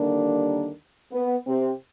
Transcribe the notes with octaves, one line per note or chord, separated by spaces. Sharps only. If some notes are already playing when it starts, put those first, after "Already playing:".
Already playing: D#2 D3 D#3 G3 A#3 D4
B3
C3 C4